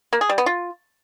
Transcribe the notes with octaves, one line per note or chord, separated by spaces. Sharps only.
A#3
G#4
G3
B3
F4